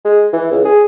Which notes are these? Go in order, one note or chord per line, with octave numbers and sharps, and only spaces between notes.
G#3
E3
C#2
G#4